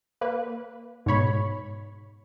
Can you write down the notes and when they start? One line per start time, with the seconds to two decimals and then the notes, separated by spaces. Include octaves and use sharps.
0.21 A#3 B4
1.06 G#2 B2 C#5 B5